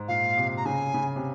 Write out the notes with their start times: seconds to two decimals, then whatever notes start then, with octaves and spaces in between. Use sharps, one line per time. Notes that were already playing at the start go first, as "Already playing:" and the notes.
Already playing: G#2
0.08 A#2 F5
0.37 C3
0.57 A#5
0.65 C#3 G#5
0.94 C#3
1.16 C3